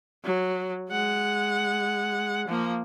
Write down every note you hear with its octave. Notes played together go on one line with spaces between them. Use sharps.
F#3
G#3 F#5
F3 A#3